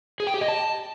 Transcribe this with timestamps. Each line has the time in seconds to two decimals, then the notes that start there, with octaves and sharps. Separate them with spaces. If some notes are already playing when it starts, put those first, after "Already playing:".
0.20 G#4
0.27 G5
0.34 G4
0.41 D#5
0.48 A5